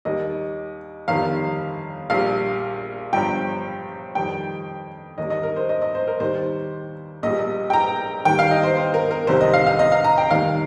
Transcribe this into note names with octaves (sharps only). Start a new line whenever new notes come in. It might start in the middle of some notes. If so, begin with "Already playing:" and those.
D#2 D#3 G3 D#5
G1 F2 D#3 G3 F5
A#1 A#2 G3 F5
G1 G2 F3 G5
F2 D#3 G3 G5
D#2 D#3 G3 D#5
D#5
A#4
C5
D#5
D#5
C5
A#4
D#2 D#3 G3 C5
A#1 A#2 G3 D#5
G5
A#5
D#2 D#3 G3 G5
F5
D#5
C5
C5
A#4
A#4
C2 C3 D#3 G3 C5
D#5
F5
F5
D#5
F5
A#5
G5
F1 D#2 D#3 G3 F5